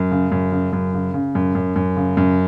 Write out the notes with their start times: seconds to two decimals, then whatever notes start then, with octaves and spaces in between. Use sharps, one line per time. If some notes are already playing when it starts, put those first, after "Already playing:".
Already playing: F#2
0.11 C#3
0.32 F#2
0.52 C#3
0.73 F#2
0.94 C#3
1.14 C#3
1.35 F#2
1.55 F#2
1.76 F#2
1.97 C#3
2.17 F#2